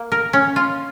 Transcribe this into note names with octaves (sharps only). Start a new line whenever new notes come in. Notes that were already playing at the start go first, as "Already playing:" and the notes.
Already playing: A#3
A#4
C#4
F4